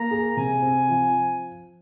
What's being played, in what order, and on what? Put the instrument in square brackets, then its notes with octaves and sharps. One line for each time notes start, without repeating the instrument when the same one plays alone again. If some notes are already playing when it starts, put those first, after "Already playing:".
Already playing: [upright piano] A#3 [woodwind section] A#5
[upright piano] G#4
[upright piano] C3 [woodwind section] G#5
[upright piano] C4
F3